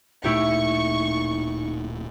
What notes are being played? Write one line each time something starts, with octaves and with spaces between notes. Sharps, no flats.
D1 A#2 A3 D#4 E4 G4 C#6